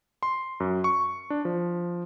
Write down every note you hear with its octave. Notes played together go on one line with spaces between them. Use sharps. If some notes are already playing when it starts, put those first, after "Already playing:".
C6
F#2
C#6
D4
F3